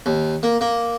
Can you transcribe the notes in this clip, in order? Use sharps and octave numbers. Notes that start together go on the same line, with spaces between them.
D#2
A#3
A#3